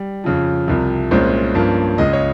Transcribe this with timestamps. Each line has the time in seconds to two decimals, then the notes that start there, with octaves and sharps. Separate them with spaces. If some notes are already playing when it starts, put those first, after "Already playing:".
Already playing: G3
0.24 F2 C#3 F3
0.68 C2 C3 F3
1.11 C2 A#2 G#3 C#4 C5
1.54 G2 F3 A#3 C#4
1.98 C#2 C#3 G#3 D#5
2.13 C#5